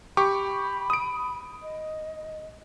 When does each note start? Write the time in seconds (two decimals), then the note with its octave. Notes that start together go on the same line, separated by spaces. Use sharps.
0.17 G4 B5 C#6 D6
0.90 D#6 D7
1.62 D#5